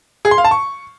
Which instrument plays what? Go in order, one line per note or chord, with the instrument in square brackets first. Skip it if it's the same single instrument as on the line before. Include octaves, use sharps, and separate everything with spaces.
[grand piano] G#4
C6
F5
A5
C#6